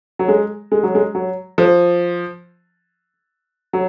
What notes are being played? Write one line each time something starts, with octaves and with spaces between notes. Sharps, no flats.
F#3
G#3
G#3
F#3
G#3
F#3
F3
F#3